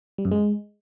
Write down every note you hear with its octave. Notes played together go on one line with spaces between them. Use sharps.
G3
F#2
G#3